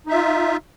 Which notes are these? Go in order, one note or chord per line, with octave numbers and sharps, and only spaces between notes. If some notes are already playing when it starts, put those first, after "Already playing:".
D#4 F4 E5